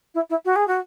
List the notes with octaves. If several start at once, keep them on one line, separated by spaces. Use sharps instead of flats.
E4
E4
F#4
G#4
F#4